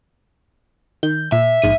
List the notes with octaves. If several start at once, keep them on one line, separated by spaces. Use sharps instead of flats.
D#3 G6
A#2 E5
A#1 G#2 D#7